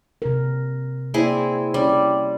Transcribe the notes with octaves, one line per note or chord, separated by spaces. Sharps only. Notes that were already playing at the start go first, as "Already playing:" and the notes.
C3 A#4
A#3 C4 E4 G#4 D5
G3 C#4 C#5
G4